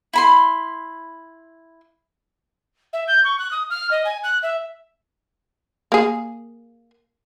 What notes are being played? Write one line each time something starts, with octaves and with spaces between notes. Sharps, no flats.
E4 B5 C6
E5
G6
C#6
F#6
D#6
F6
D#5
G#5
F#6
E5
A#3 G#4